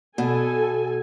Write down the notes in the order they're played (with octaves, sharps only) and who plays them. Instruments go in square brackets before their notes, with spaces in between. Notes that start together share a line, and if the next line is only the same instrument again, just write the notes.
[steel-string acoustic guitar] B2 [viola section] A4 G#5